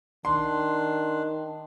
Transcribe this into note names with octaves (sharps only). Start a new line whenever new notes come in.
D#3 D4 C6